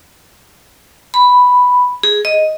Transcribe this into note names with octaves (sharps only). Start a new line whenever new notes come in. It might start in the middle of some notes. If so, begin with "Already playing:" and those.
B5
G#4
D#5